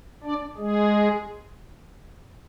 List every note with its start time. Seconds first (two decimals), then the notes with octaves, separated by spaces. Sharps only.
0.24 D4 D5
0.57 G#3 G#4